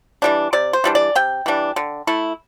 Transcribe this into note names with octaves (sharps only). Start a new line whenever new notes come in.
E3 G3 D4
C3 D5
C5
E3 G3 D4
D5
C3 G5
E3 G3 D4
D3
A3 E4